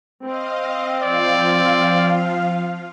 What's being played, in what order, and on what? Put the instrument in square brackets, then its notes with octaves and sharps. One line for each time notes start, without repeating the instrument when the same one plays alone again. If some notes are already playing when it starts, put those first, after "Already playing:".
[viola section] C4 [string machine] D#5 F5
[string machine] F3 F4 F5 [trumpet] D5